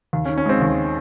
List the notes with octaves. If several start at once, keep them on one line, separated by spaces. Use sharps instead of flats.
D#2
C#4
D#3
C#4
G#3 C4
D#2